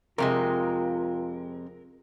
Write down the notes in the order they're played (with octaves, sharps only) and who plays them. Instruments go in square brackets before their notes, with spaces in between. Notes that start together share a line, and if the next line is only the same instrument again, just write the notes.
[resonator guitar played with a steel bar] F2 C3 G#3 [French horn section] F4 [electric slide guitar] A#4